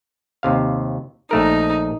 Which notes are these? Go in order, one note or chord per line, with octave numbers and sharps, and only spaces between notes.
D#2 C3 F5
A#1 A3 D#4 A#4